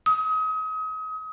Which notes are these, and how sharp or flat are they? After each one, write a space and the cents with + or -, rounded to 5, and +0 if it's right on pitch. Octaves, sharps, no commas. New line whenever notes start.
D#6 +35